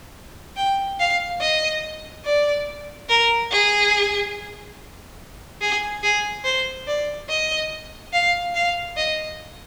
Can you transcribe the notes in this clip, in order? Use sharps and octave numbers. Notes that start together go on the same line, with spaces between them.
G5
F5
D#5
D5
A#4
G#4
G#4
G#4
C5
D5
D#5
F5
F5
D#5